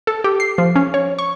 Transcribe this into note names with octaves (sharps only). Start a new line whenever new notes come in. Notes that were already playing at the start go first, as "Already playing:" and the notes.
A4
G4
C7
F3
C#4
C#5
C#6